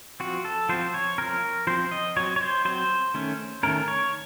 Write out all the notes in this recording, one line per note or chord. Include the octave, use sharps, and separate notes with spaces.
F3 C4 F#4
A4
F3 C4 C5
C#5
F3 C4 A#4
F3 C4 C5
D#5
F#3 C4 C#5
C#5
C5
F#3 C4 C5
D#3 A3 C#4
D#3 A3 C#4 A#4
C#5